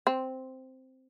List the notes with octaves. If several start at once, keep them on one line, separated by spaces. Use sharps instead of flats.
C4